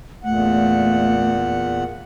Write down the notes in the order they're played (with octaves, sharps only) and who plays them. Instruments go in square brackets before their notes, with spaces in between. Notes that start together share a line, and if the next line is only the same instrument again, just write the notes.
[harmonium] E2 A#2 F#5 [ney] A3